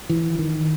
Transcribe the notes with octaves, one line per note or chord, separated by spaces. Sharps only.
E3
D#3